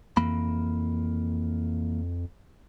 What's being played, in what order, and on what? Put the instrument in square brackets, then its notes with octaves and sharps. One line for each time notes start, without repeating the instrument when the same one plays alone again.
[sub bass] F2 [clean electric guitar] E3 A#3 B5